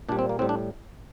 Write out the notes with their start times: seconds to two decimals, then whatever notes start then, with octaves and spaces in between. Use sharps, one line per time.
0.09 A#2 D4
0.12 G3
0.19 C4
0.29 A#3
0.39 A2 G3 C4
0.49 D4